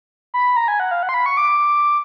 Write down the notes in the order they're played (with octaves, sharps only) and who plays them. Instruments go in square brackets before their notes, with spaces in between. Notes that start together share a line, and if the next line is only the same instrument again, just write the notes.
[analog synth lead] B5
A#5
G#5
F#5
F5
F#5
C6
B5
C#6
D6